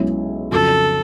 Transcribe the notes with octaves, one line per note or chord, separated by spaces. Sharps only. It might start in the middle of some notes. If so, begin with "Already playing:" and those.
Already playing: B1 B2 G#3 C#4 E4
F2 C#3 F#3 A4